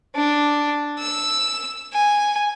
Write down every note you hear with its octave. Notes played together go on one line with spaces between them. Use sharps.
D4
E6
G#5